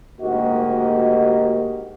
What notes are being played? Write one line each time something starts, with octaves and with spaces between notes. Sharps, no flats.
D2 G#2 A#3 F#4 G4 D#5